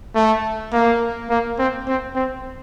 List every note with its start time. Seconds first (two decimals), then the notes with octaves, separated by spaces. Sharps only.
0.15 A3
0.73 A#3
1.30 A#3
1.59 C4
1.88 C4
2.16 C4